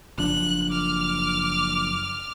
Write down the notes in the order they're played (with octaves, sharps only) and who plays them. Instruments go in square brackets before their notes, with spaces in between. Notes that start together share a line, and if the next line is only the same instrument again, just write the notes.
[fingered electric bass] F#1 F3 D4 [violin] F#6
[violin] D6 F6